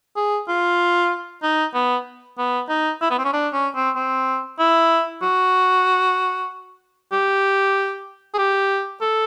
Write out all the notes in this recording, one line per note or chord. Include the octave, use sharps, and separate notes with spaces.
G#4
F4
D#4
B3
B3
D#4
E4
B3
C4
C#4
D4
C#4
C4
C4
E4
F#4
G4
G#4
G4
A4